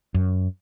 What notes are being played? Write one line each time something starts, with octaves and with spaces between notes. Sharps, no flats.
F#2